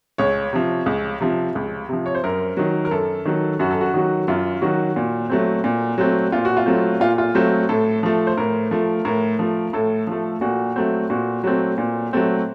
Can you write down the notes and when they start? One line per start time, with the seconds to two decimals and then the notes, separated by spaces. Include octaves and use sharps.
0.18 C#2 C#5
0.53 C3 F3
0.86 C#2
1.21 C3 F3
1.55 C#2
1.89 C3 F3
2.06 C#5
2.15 C5
2.24 F#2 A#4
2.57 D#3 F#3
2.85 A#4
2.91 F#2 A4
3.25 D#3 F#3
3.59 F#2 F#4
3.71 A4
3.81 F#4
3.94 D#3 F#3
4.28 F#2 F4
4.61 D#3 F#3 F#4
4.96 A#2
5.30 F#3 A3 C4
5.64 A#2
5.98 F#3 A3 C4
6.32 A#2 F4
6.45 F#4
6.57 F4
6.66 F#3 A3 C4
7.00 A#2 F4
7.18 F4
7.35 F#3 A3 C4
7.69 A2 A4
8.03 F3 A3
8.27 C5
8.37 A2 A#4
8.71 F3 A3
9.05 A2 A#4
9.39 F3 A3
9.73 A2 A4
10.07 F3 A3
10.41 A#2 F#4
10.76 F#3 A3 C4
11.10 A#2 F#4
11.44 F#3 A3 C4
11.78 A#2
12.13 F#3 A3 C4